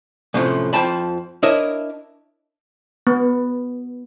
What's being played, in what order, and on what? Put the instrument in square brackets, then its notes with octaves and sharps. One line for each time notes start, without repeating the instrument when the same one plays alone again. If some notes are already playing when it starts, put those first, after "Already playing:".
[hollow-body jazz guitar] F#2 A2 C3 F3
F2 F3 G5 A5 B5
D4 E4 A#4 C#5 D#5 E5
[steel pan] B3